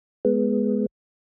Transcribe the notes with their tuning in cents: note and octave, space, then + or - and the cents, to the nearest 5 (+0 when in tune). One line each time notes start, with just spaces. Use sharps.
G#3 +10 B3 +0